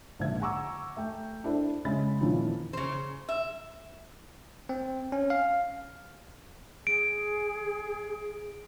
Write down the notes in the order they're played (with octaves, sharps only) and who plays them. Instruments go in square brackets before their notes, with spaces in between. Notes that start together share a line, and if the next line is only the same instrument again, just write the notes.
[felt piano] A#1 G#2 D3 D4 E5 G#6
F#5 G#5 A#5 C#6 D6 E6
A3 G5
D4 E4 A4 C5 D5
C#3 G#3 E5 B5 A6
F2 A#2 D#3 E3 C#4 E4
[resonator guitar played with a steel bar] C#3 C5
E5
[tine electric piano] C4
C#4
F5
[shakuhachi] G#4 [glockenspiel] D7